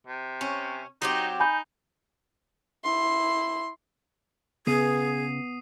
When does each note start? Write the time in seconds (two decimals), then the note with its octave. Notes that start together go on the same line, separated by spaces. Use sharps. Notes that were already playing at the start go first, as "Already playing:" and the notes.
0.07 C3
0.41 C#4
1.02 F#3 C4 D#4 G4
1.40 D#4 G#5 B5 G6
2.84 E4 C6
4.67 C#3 B3 G#4 D#6 C7 D#7